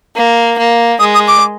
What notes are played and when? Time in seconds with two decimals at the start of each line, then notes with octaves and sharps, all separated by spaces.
0.16 A#3
0.58 A#3
1.00 G#3 D#6
1.14 D#6
1.28 D6